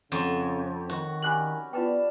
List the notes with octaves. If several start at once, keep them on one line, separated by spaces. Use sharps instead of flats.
F2 C#3 C#5 F#5
D#3 F#4
C#4 G4 G#5 B5 F#6 F#7
B3 D4 F4 F5 G5 A5